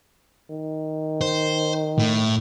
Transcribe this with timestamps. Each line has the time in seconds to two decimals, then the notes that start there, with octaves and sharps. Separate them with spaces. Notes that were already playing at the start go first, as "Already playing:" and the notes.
0.50 D#3
1.21 C5
1.99 A2